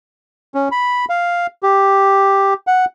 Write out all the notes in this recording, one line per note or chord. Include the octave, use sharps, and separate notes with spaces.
C#4
B5
F5
G4
F#5